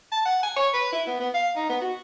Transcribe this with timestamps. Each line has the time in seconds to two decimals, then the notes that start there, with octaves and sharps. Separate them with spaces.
0.12 A5
0.25 F#5
0.43 G#5
0.56 C#5
0.74 B4
0.92 E4
1.07 B3
1.20 B3
1.34 F5
1.56 D#4
1.70 B3
1.81 F#4